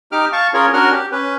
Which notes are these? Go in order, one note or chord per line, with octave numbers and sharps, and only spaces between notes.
D#4 G4 D6 F6
F5 A5 C#6
C#4 F4 G#4 A#4 C#5
C#4 D4 F#4 A#4 F#5 F6
G4
C#4 B4